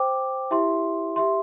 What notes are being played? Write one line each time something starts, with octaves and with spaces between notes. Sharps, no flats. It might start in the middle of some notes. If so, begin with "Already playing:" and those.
Already playing: C5 G5 D6
E4 G4 E5 C6
G4 E5 C6